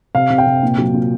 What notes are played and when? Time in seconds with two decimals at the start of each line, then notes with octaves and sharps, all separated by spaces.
0.15 C3 F5
0.30 C3
0.38 G5
0.46 C3
0.63 A#2
0.78 F#3
0.94 A#2